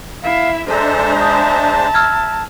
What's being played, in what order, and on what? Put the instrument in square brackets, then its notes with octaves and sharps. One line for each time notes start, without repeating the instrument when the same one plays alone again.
[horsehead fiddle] E4 E5 [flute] F5
[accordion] G#3 D4 C5 [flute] A4 [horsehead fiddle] E5 A#5
[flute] A5 [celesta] D#6 G6
[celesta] E6 F6 G#6